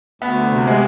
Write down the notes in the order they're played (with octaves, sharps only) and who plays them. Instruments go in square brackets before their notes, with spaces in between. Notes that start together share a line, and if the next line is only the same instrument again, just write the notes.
[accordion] D2 [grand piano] B3
[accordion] C3
[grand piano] G#3